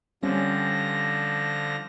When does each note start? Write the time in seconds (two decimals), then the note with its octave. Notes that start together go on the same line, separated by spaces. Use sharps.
0.23 D3 F3 G3 C4 C#4 A#6